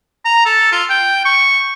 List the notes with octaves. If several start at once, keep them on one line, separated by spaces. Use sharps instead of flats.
A#5
A4
F4
G5
C#6